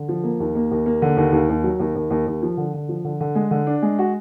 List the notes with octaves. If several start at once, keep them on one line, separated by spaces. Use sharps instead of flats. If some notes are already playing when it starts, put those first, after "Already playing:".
Already playing: D3
F3
A#3
D#2
A#3
D#2
A#3
D3
D#2
D#2
D#2
F#3
D#2
D#2
D#2
D#2
F3
D3
D3
F3
D3
D3
G#3
D3
D4
G#3
F#4